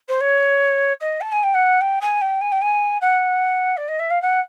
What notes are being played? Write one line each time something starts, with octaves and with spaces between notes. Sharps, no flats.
C5
C#5
D#5
A5
G#5
G5
F#5
G5
G#5
G5
G#5
G5
G#5
F#5
D5
D#5
E5
F5
F#5